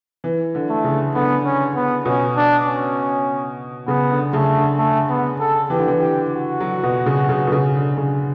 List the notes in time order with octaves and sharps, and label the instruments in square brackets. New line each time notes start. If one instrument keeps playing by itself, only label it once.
[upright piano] E3
D3
[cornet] A3
[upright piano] C#3
[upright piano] D3 [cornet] B3
[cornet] C#4
B3
[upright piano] B2 [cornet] C#4
[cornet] D4
C#4
[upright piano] C#3 [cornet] B3
[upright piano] D3
[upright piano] C#3 [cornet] A3
[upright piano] D3
[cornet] A3
B3
A4
[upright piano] E3 [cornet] G4
[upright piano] D3
E3
[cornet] G4
F#4
[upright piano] F#3
B2
C#3
C#3
B2
C#3
D3
C#3